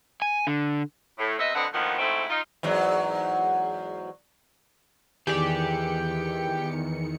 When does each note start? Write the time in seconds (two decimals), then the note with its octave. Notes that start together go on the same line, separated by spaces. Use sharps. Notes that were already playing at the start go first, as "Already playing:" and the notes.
0.22 G#5
0.47 D3
1.19 A2
1.39 C3 B3 D#5 E5
1.55 D3 F3 C4 B4 D#5 F#5
1.72 D2 A#2 D#3 F3 B3
1.99 G#2 G#3 A3 C4 E4 F#4
2.29 D#4 F4
2.63 E2 G#2 F#3
5.27 E2 D#3 E3 G4 G#4 D5 C#7